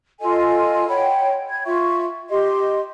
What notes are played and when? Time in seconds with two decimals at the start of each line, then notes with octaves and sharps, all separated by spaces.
0.20 F4 A4 D#5 G#5
0.88 C#5 F#5 G5 B5
1.49 G#6
1.64 F4 E5 C#6
2.29 G4 D#5 C6